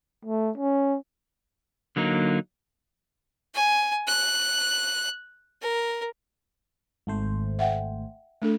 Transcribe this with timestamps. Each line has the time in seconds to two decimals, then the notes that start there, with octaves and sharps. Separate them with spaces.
0.25 A3
0.57 C#4
1.96 D3 F#3 A#3 D#4
3.54 G#5
4.07 F#6
5.62 A#4
7.07 G#1 A3 C5
7.59 E5 F#5 G5
8.42 A3 D4 A4